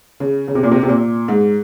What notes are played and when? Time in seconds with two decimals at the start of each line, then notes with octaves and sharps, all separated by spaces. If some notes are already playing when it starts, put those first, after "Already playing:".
0.20 C#3
0.48 C#3
0.55 C3
0.63 A#2
0.72 C3
0.83 C3
0.88 A#2
1.28 G#2